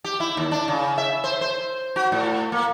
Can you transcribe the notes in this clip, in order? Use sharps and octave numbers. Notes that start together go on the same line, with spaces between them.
G4
E4
D#2
D4
C#3
E5
C5
C5
F#4
A2
A#3